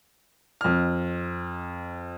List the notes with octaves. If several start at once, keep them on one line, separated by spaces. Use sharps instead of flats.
F2 F6